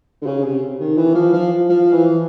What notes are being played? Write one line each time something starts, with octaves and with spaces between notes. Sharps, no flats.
D3
C#3
C3
D#3
E3
F3
F3
F3
E3